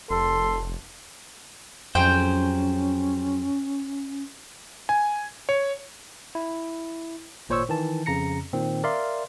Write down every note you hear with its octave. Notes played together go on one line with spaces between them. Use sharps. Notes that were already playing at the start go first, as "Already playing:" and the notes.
F1 A4 C6
F2 F#3 C#4 G#4 C5 G5
G#5
C#5
E4
G#1 A#2 C5 C#5 C#6 E6
D#3 E3 A5
F2 C#3 A#5 A#6 C#7
A#2 D#3 C4
A#4 D5 E5 F5 C6